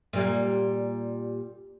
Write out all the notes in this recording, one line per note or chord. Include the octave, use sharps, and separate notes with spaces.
A#2 G3 A#3